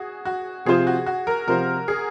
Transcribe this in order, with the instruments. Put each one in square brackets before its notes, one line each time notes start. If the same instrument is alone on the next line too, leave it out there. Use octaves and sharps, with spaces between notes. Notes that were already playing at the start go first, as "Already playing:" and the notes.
Already playing: [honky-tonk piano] F#4 G#4
F#4
[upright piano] C3 F3 C4 F4 C5 [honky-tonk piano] G#4
[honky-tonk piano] F#4
F#4
A#4
[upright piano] C3 F3 C4 F4 C5 [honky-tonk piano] A#4
[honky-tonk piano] G#4